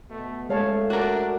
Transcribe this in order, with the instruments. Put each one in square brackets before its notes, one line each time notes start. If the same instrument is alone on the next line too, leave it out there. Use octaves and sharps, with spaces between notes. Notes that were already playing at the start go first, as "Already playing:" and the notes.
[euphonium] B2 [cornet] A3
[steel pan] G#3 C#5 A5 [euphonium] A3 [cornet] F5
[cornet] D4 [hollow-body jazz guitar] F#4 A#4